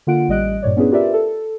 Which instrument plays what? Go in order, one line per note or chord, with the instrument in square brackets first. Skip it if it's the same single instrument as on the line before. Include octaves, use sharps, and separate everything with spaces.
[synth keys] D3 A#3 F4 F#5 D7
A1 G3 D#5 F#6 D7
G2 A#2 C#5 D5
B3 C#4 D4 E4 G#4 B4
F4 G4 A#4 B4 D5 E5
A4